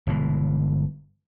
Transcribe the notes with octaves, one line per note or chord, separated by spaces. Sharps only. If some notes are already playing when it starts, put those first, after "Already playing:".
G1 B2 E3 G#3